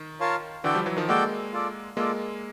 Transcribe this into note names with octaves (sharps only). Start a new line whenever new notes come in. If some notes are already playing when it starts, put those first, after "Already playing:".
Already playing: D#3
F4 A#4 C#5 F5 A5
D3 E3 F#4 A4 D5 G5
F3 G3
E3 F#3
D#3 F3
G#3 A#3 F#4 A4 D5 G5
F4 A4 D5
G#3 A#3 F4 A4 D5